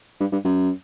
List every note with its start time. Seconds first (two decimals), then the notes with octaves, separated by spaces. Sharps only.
0.20 G2
0.32 G2
0.44 F#2